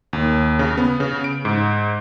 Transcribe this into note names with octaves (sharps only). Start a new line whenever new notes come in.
D#2
C#3
B3
C#3
D7
G#2